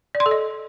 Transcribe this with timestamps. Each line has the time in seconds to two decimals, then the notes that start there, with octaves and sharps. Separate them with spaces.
0.15 D5
0.20 C6
0.26 A4
0.31 D#5